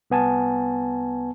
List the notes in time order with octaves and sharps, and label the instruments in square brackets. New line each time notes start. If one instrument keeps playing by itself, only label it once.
[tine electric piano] C2 B3 G#5 A5